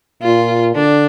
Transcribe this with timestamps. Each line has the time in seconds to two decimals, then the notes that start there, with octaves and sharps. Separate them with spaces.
0.23 A#2 F4
0.75 D3 D4